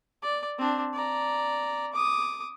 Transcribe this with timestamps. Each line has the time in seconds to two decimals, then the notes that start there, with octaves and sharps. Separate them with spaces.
0.23 D5
0.58 C4 D4
0.93 D5 A#5
1.93 D6 D#6